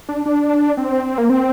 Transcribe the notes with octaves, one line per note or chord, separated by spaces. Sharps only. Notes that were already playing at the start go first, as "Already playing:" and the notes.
D4
D4
C4
A#3
C4